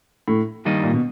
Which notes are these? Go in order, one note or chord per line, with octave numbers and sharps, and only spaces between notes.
A2
G2 D#3 G3 A#3 D#4
A#2
B2